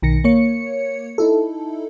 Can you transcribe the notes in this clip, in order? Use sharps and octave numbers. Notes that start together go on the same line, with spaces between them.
B1 D#3 A#6 C#7
A#3 C#5 C#7
D#4 E4 A4